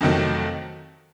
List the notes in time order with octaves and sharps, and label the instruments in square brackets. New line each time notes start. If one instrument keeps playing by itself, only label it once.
[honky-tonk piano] F2 C3 D#3 F#3 A3